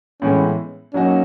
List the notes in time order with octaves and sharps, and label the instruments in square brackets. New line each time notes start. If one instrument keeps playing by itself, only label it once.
[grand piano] A2 E3 G#3 B3 [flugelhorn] C#4
[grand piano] F#3 A#3 D#4 F#4 [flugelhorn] C#4